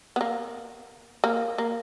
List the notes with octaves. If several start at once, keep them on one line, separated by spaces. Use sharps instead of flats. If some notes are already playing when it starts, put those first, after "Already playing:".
B3
A#3
A#3
A#3